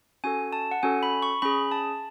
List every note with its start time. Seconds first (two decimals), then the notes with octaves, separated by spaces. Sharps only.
0.24 C#4 F#4 A4 G#5
0.53 A5
0.71 F#5
0.83 C#4 F#4 A4 G#5
1.03 B5
1.22 C#6
1.42 C#4 G#4 B5
1.72 A5